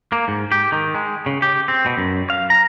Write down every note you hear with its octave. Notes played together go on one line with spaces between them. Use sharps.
A#3
G#2
G4
D#3
G#3
C#3
G4
C4
B2
F#2
F5
A#5